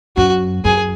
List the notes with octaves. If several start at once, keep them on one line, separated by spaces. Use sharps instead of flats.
F#2 F#4
F#2 G#4